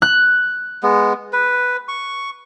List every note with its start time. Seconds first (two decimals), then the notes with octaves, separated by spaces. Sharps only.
0.02 F#6
0.83 G#3 B3
1.33 B4
1.88 C#6